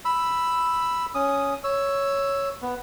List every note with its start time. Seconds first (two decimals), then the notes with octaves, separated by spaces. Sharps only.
0.05 B5 E6
1.15 C#4 D#6
1.64 C#5 E6
2.62 B3